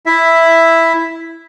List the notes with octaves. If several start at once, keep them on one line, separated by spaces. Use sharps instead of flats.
E4 E5